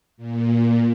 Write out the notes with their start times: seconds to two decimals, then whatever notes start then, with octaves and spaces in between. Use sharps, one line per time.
0.17 A#2